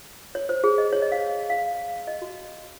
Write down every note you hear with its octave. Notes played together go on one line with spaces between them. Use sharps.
C#5
C5
G#4
D#5
C#5
D#5
F5
F5
D#5
F#4